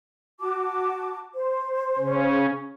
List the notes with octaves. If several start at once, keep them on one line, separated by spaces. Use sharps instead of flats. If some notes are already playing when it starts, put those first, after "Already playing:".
F#4 A5 D6
C5
C#3 C#4